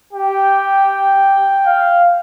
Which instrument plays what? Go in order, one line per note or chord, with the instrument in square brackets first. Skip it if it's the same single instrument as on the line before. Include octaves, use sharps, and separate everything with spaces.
[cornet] G4 [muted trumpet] G5
[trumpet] F5